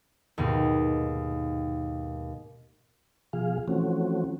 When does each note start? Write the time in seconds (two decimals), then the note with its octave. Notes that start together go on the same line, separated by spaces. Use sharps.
0.38 D#2 G#2 B2
3.33 B2 F3 G#4 F5
3.68 E3 F3 A3 C4 C#4 F#4